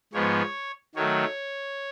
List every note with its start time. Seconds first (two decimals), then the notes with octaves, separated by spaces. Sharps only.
0.13 G#2 F3 G#3 B3 C#5
0.95 D#3 F#3 A3 C#5